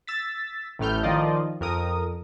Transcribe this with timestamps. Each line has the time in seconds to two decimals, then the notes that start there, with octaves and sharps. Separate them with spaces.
0.07 E6 A6 B6
0.79 A1 A2 A3 F6 G6
1.03 D#3 F3 F4 D5 D#5
1.61 F2 A#4 D#6